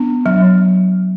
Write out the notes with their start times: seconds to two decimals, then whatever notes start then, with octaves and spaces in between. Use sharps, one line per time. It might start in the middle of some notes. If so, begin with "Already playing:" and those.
Already playing: B3 D4
0.26 F#3